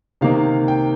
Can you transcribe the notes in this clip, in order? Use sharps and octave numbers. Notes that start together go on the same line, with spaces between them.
C3 D#3 A#3 D#4 F5
G5